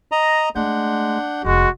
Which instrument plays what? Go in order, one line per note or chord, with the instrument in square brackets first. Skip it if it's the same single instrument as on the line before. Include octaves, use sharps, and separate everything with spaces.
[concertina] D#5 A#5
[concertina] G#3 [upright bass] A3 [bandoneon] D4 F#5 G6
[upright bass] F1 D3 [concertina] G#3 [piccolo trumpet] F#4